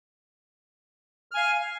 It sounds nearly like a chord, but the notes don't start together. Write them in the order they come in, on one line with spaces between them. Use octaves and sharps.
F6 G#5 F5